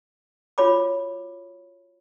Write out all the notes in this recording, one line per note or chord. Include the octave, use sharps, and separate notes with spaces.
F4 F#4 C#5 B5 D6